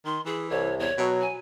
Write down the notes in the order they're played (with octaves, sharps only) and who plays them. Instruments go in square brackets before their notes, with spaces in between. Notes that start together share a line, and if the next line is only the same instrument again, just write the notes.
[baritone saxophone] D#3 [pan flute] C6
[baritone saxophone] E3 [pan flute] G#4
[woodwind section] C2 [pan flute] C#5
[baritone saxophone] E2 [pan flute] C#5
[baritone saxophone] B2 [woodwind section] F#3
[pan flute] G#5